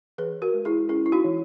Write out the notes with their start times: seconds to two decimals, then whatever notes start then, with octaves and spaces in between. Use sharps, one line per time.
0.18 E3 G#4 B4
0.42 F#4 A#4
0.54 G#3
0.65 E4 G#4
0.89 C#4 E4 G#4
1.06 E4
1.12 D#4 F#4
1.24 E3